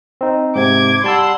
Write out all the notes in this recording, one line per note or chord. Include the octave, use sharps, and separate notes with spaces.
C4 D#4
G#2 C3 D6 G#6
G3 F#5 A5 C6 E6